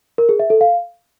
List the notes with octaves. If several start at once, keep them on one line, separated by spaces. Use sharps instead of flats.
A#4
G#4
E5
A4
F5